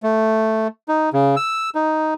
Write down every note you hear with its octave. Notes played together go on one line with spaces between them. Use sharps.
A3
D#4
C#3
E6
D#4